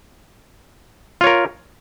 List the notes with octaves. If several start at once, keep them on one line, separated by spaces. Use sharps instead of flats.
F4 A#4 C#5